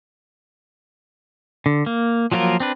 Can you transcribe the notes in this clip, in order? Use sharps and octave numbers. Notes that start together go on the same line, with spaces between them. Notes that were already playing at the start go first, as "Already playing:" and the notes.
D3
A#3
F3 F#3 A#3 F4 A#4
C4 D4 B4